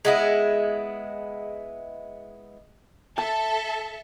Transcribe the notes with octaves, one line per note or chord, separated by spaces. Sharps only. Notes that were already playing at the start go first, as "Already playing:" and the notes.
G#3 B3 E4
A4 E5 A5